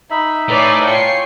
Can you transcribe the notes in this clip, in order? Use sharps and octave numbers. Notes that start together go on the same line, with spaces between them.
D#4 E5 B5
A2 B4 C#5 D5 G#5 D6
F4 C#5 G5 G#5 C#6 C7